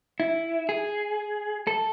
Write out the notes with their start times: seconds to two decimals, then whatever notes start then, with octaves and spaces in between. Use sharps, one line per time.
0.20 E4
0.69 G#4
1.67 A4